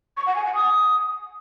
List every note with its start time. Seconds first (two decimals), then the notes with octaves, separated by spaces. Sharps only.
0.17 C#6
0.26 F#5
0.36 G#5
0.45 F#5
0.54 D#6